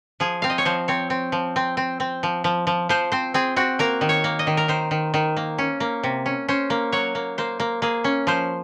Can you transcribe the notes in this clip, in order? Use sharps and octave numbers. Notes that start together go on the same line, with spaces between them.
F3 G#4
C4 F5
D#5
C#5
F3 C5
C4 C#5
C4
F3
C4
C4
C4
F3
F3
F3
F3 C5
C4 C5
C4 G#4
C4 F#4
A#3 A#4
D#3
C#5
A#3
D#5
D#3
A#4
D#3 C5
D#3
D#3
A#3
C#4
A#3
C3
C#4
C#4 C5
A#3
F#3 C#5
A#3
A#3 C5
A#3
A#3 G#4
C#4
F3 C5